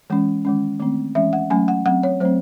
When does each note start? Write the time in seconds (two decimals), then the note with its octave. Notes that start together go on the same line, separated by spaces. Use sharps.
0.10 E3 G#3 C#4
0.45 D#3 G#3 C#4
0.80 D#3 A3 C4
1.15 E3 G#3 C#4 E5
1.33 F#5
1.50 F#3 A3 C#4 G#5
1.68 F#5
1.86 F#3 C4 F#5
2.03 C#5
2.20 F#3 A3 C4 C5